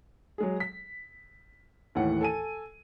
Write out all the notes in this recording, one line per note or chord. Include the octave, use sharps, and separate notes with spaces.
F#3 G#3 G#4
B6
D#2 A2 E3 F#5
A4 G#5 D#7